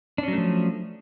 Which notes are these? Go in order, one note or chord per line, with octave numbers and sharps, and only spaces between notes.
F3 F#3 A3 C#4 D4